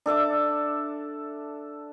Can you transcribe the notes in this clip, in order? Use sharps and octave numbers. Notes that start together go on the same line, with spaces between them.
D4 A4 E5 D6